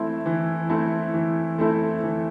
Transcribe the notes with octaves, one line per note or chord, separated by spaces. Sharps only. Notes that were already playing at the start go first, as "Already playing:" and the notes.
Already playing: E3 A3 C4 E4 A4
E3
A3 C4 E4 A4
E3
A3 C4 E4 A4
E3